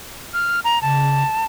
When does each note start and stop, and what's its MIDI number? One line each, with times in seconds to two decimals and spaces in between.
0.34 0.60 89
0.64 0.81 82
0.82 1.22 49
0.82 1.46 81